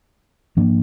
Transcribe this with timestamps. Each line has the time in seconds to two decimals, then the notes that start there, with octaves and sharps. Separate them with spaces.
0.57 G#2 F3 A#3 D4